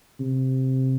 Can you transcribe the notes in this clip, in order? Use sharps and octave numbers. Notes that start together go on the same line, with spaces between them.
C3